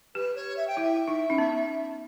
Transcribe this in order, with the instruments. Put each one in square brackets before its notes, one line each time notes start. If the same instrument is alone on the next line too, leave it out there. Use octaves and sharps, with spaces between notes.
[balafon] G4 [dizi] B4
[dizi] C#5
E5
G5
[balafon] E4 [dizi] E5
[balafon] D#4
C#4
B3